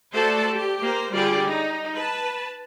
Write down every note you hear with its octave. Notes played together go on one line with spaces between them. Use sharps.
A3 F#4 A4 C5 D5 A5
G4
A#3 C5
D3 G3 F4 G4 G#4 D5
D#4
B4 A5